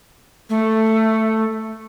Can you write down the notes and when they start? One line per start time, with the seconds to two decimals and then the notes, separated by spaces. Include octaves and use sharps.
0.50 A3